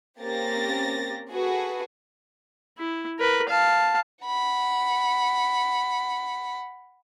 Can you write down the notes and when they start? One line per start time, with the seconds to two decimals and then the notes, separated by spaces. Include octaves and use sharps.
0.20 A#3 C4 C#4 G4 A6 A#6
1.30 F#4 G#4 A4 B4
2.78 E4
3.19 A#4 B4
3.49 F5 A5
4.25 F#5 B5